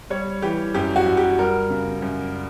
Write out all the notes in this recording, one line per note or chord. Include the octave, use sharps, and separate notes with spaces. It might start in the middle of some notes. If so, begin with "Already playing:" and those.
G3 C#5
E3 G4
F#2 G4
F#4
F#2
G4
G3 A#4
C#3
F#2